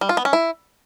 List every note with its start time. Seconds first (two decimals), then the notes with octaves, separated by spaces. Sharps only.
0.01 G3
0.09 F4
0.17 B3
0.25 C#4
0.33 E4